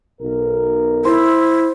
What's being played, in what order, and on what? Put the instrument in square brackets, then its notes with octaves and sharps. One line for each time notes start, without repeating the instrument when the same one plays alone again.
[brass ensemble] B1 A#4
[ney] E4 [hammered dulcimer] C5